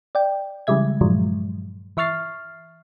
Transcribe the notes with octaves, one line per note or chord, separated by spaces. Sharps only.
D5 G5
C#3 E3 G3 G#3 E5 G#6
G2 A#2 D#3 F3 F#3 G#3
E3 E5 C#6 F6 A6 C7